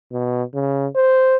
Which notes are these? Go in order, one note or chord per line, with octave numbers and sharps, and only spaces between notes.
B2
C#3
C5